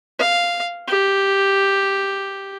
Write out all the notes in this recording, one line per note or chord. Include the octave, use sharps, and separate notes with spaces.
F5
G4